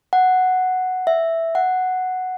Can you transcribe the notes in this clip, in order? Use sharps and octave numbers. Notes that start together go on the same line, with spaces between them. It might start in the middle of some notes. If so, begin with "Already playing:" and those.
F#5
E5
F#5